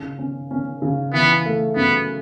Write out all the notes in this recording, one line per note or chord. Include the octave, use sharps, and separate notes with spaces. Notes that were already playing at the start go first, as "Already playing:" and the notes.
Already playing: C#3
C#4
C#4
C#3
E3 B3
A3
F#2 B3